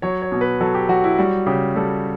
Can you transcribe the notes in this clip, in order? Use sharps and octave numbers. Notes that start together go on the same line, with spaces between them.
F#3 C#5
C#5
B2
B4
F#3 A4
G4
F#3 F#4
E4
G3 F#4
C#3 G4
G3 A4